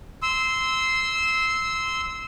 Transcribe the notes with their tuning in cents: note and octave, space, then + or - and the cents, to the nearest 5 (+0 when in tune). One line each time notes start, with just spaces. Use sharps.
C6 -10 E6 -15